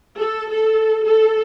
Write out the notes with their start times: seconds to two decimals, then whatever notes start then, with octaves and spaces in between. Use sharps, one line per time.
0.16 A4
0.50 A4
1.05 A4